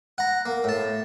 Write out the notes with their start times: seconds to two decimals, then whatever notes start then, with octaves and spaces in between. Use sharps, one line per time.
0.18 F#5 A#5
0.45 A#3
0.64 A2 A5